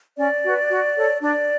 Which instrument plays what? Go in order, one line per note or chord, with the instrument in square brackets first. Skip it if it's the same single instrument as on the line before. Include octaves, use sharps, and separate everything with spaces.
[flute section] C#4 D5
F#4 B4
F#4
A4 C#5
D4 D5